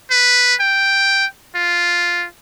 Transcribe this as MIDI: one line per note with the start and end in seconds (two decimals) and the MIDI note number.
0.11 0.55 71
0.60 1.26 79
1.55 2.27 65